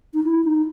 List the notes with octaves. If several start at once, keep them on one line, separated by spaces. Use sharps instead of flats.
D#4
E4
D#4